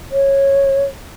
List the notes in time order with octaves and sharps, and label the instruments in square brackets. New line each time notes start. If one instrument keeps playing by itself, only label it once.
[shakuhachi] C#5